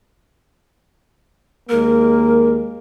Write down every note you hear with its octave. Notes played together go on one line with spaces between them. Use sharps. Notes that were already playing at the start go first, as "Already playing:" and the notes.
D#2 G#3 A#3 A#4